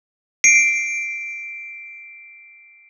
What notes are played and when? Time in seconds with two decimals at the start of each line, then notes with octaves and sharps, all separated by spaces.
0.44 C7 D7